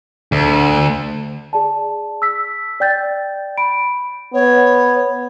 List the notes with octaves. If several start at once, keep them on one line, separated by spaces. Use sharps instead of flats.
D2
G#4 D5 A5
E6 B6
D5 G5 G6 A6
B5 D7
B3 C#5